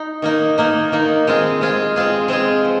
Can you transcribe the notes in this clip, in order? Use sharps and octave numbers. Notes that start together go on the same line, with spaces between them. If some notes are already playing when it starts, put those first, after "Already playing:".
Already playing: D#4
D#3 A#3 D#4
D#3 A#3 D#4
D#3 A#3 D#4
G#3 C4 F4 G#4
G#3 C4 F4 G#4
G#3 C4 F4 G#4
G#3 C4 F4 G#4
F3